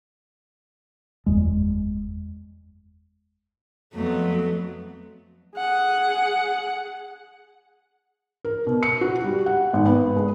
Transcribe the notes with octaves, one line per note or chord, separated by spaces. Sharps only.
F#1 E2 G#3
F2 F#3 A3 B3
G#4 F#5
A#4
B2
C#7
F#4
G3
F#5
G#1
B3
G#3